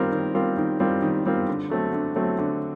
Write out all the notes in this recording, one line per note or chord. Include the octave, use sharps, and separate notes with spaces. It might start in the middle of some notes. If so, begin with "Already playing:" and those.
Already playing: D#3 G3 C4 F4 A#4
D#3
G3 C4 F4 A#4
D#3
G3 C4 F4 A#4
D#3
G3 C4 F4 A#4
D3
F#3 A3 C4
D3
F#3 A3 C4
D3